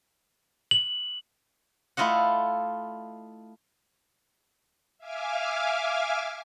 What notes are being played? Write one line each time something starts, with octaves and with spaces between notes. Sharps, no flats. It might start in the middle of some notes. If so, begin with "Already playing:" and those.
F#7
A3 E4 F4 D#5 F#5
E5 F5 G#5 D6 F6